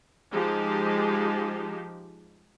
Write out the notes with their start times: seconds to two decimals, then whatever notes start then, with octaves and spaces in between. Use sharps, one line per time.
0.32 F3 G#3 D#4 G4